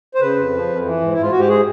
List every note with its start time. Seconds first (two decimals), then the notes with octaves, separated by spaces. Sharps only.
0.14 C5
0.21 C#3 B4
0.37 F2
0.53 F3
0.68 F2
0.85 E3
1.01 G#2
1.13 E4
1.18 G#2 F4
1.31 G#2 F#4
1.40 G4
1.49 G#4